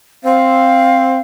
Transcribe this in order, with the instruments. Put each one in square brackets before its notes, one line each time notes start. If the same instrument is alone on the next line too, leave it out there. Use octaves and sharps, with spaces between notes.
[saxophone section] C4 [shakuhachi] F5